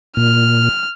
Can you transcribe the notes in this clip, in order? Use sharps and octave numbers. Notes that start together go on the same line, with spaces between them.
A#2 F6